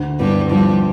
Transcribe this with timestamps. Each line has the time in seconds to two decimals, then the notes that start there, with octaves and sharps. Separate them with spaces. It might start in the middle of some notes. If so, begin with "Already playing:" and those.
Already playing: D2
0.20 G2 G3 B3
0.50 G2 F3 G3